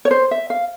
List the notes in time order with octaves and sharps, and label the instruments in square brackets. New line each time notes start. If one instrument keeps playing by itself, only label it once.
[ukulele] C#5
C5
E5
F5